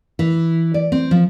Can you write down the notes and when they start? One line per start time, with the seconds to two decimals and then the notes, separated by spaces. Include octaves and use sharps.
0.19 E3
0.74 D5
0.92 C4
1.11 F3